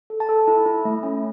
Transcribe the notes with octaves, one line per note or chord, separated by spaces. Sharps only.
A4
A5
A4
E4
E4
A3
C#4